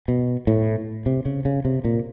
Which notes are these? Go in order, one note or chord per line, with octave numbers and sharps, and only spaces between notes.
B2
A2
C3
C#3
C#3
C3
A#2